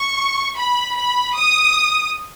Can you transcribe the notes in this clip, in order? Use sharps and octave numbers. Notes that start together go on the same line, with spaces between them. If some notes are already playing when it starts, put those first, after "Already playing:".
Already playing: C#6
B5
B5
D#6